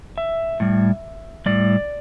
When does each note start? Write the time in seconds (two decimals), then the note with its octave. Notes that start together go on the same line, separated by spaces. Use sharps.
0.18 E5
0.60 A2 G3
1.46 A2 G3 D5